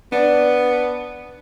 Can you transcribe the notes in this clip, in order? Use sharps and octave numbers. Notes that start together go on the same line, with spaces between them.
B3 D4